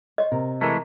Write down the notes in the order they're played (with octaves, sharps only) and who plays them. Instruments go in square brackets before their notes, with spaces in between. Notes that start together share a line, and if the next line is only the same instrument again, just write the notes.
[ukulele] C5 C#5 [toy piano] D#5
[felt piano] C3 [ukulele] A#4
[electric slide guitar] E3 G#3 A3 [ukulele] A#4